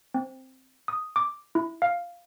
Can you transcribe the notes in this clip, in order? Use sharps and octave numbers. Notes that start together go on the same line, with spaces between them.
C4
D#6
D6
E4
F5